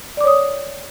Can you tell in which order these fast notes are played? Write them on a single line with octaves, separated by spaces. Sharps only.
D5 D6 C#5 D#6